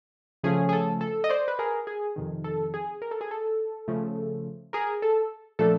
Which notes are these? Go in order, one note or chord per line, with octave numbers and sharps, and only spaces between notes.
C#3 F3 A3 C#4 G#4
G#4
A4
A4
D#5
C5 D5
B4
G#4 A#4
G#4
F2 C3 D#3
A4
G#4
A#4
A4
G#4
A4
C#3 F3 A3
G#4 A#4
A4
A#2 F3 A3 D4 A4